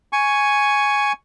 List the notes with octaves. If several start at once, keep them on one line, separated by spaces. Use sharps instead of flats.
G#5 C#6